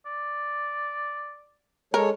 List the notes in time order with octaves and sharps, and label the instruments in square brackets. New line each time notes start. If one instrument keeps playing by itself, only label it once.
[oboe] D5
[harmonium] G#3 A4 C#5 [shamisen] A#4